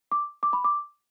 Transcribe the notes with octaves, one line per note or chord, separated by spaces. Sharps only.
D6
D6
B5
D6